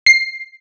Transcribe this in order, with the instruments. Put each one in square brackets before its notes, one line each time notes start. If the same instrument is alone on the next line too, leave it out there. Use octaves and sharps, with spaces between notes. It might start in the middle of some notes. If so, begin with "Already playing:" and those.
[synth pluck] C7